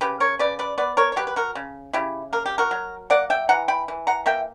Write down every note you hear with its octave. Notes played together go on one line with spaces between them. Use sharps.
C#3 G4 B4
A#4 C#5
C#3 B4 D5
B4 D5
B3 B4 D5
A#4 C#5
C#5
F#3 G4 B4
B4
F#4 A#4
C#3
C#3 E4 G4
A#3 A#4
G4
F#4 A#4
F#3
A#3 D5 F#5
E5 G5
E3 F#5 A#5
G5 B5
E3
F#5 A#5
A#3 E5 G5